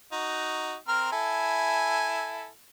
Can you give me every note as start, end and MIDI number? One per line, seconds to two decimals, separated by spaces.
0.12 0.75 63
0.12 0.75 66
0.88 1.08 60
0.88 1.08 70
0.88 1.08 89
1.12 2.48 64
1.12 2.48 69
1.12 2.48 80